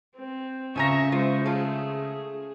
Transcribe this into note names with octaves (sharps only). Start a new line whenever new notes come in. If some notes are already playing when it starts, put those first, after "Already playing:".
C4
C#3 F3 E5 G#5 A#5 C#6 A#6
G#3 F4 C5
A3 C#4 F4 G#4